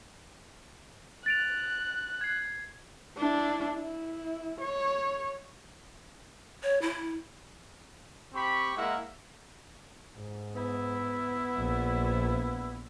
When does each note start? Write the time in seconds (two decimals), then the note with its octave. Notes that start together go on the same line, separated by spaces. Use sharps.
1.26 F#6 A6 D7 F7
2.21 G#6 C7
3.17 D4 E4
3.79 E4
4.61 C#5
6.63 C#5
6.82 E4
8.34 C4 G4 B5 C#6
8.76 G#3 A#3 E4 A#4 E5 F#5
10.16 G#2
10.55 B3 E4
11.56 A#1